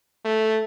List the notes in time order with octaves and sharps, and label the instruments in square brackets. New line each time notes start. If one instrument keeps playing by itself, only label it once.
[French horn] A3